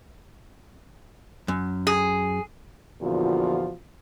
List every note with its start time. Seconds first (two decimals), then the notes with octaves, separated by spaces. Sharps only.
1.48 F#2
1.87 G#4
3.01 E2 A#2 D3 F3 F4 F#4